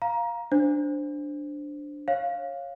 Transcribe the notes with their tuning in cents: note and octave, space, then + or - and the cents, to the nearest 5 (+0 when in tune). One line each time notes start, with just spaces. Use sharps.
F5 +0 A#5 +15
D4 +0 C5 +0
C#5 -15 F5 +0